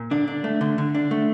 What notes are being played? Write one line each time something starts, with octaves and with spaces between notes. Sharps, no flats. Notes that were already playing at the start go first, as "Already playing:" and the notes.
Already playing: A#2
D3 D4
D4
A3
D3
D3
D4
A3